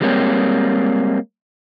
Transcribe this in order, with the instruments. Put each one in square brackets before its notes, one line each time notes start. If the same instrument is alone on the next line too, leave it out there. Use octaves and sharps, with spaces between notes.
[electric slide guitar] E3 G3 G#3 A#3 C4 C#5